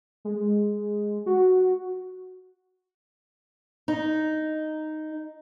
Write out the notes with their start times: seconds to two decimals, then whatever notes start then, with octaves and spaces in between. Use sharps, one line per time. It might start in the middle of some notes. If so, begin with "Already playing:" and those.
0.25 G#3
1.26 F#4
3.88 D#4